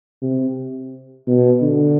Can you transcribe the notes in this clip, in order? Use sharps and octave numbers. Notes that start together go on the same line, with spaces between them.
C3
B2
D3